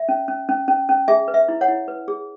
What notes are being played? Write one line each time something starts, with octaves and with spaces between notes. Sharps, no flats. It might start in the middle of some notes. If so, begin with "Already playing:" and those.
Already playing: E5
C#4
C#4
C#4
C#4
C#4
G#4 E5 G#5
B4
E5
E4
C#5 F#5
E4
B4
G#4